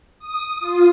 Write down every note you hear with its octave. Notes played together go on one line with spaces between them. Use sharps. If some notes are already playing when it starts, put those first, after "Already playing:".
D#6
F4